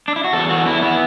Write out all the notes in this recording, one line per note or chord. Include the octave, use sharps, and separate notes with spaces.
D4
E4
F#4
E2 A4
E3 F#4
E2 E4
B3 E4